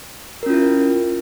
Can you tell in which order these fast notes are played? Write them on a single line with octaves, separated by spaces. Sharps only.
A#4 C#4 F4 E4